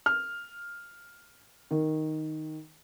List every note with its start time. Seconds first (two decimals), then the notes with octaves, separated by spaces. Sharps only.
0.06 F6
1.71 D#3